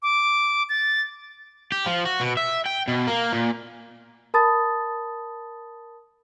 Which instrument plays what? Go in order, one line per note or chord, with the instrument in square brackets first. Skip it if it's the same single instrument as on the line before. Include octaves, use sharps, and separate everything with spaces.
[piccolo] D6
A6
[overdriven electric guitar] G4
F3
F#4
B2
E5
G5
B2
A#3
A#2
[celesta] A#4 A5 B5 D#6 A6